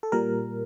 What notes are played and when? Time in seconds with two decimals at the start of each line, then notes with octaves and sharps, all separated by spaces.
0.03 A4
0.12 A#2 G3 A#4